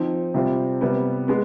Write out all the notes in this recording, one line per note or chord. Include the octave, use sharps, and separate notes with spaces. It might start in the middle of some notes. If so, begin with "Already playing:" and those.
Already playing: F3 C4 D#4
C3 G3 C4 F4
C3 G3 B3
G#3 B3